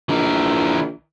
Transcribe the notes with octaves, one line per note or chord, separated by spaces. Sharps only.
A#1 E3 A#4